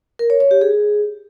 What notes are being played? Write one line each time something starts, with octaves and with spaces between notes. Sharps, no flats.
A#4
C#5
C#5
G4
G#4